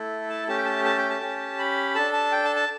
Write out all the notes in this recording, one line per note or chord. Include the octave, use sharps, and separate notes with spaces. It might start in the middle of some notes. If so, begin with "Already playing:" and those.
Already playing: A3 E4 A4
A5
A3 C#4 G4 A5
G5
A5
A5
G5
A5
C#4 G4
B5
D4 A4 A5
A5
G5
A5
A5